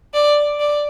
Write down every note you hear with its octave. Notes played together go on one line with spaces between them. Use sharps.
D5
D5